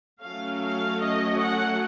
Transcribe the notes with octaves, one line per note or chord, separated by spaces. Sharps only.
F#3 A3 C#4 F5
F5
D#5
F#5